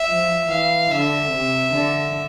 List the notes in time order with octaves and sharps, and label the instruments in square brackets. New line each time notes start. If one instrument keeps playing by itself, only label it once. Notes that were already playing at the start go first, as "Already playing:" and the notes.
Already playing: [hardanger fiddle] E5
[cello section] F3
[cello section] E3 [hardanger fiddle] F5
[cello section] D3 [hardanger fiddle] E5
[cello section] C3
D3